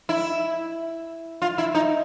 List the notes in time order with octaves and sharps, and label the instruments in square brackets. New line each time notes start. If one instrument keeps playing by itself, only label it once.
[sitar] E4
F4
E4
D#4